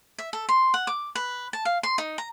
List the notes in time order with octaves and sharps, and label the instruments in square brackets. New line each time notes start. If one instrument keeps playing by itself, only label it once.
[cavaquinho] E5
A4
C6
F#5
D6
B4
A5
F5
C6
D#4
A#5